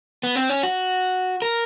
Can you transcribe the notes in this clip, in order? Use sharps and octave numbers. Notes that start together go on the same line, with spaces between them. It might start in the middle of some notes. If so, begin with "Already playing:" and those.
B3
C4
C#4
F#4
A#4